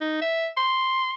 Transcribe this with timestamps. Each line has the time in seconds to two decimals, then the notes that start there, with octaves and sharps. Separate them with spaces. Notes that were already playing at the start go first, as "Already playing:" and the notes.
0.01 D#4
0.22 E5
0.57 C6